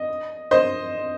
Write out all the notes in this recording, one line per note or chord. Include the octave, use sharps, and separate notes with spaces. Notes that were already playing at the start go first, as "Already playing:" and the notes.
Already playing: D#5
C5 D#5